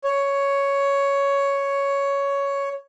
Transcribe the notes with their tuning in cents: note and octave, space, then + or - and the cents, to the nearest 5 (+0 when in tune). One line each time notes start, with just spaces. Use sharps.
C#5 +5